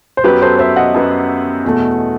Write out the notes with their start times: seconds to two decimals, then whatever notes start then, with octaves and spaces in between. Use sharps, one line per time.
0.17 C5
0.24 F#2 F#3 B3 G4 B4
0.42 A4 C5
0.59 C5 E5
0.76 D#5 F#5
0.94 F#2 F#3 B3
1.64 E2 B2 A3